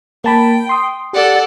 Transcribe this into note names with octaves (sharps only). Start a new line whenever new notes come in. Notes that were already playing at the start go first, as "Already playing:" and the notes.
A#3 G5 A5 B5
C6 D#6
G4 A4 D5 F#5